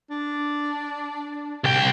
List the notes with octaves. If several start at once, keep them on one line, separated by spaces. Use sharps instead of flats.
D4
C2 G5